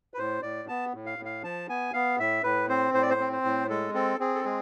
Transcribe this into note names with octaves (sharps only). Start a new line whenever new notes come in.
B4
A2 C5
A2 D5
B3 A5
A2
F5
A2
F5
F3 A5
B3 G#5
B3 F5
A2 E5
A2 B4
C4 C5
A2 C5
D5
C5
C4
C5
A2
G#3 A4
C4 A4
C4 G#4
A4
G#3 G#4